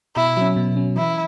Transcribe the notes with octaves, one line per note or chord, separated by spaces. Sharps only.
B2 E4
F#3 C#4
B2
F#3 C#4
E3 E4